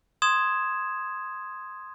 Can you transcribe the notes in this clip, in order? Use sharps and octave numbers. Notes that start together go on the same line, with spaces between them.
C6 D#6 G#6 E7